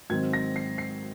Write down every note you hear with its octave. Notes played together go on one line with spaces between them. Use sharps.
G#2 D#3 F#3 C4 G#6
A#6
C7
C7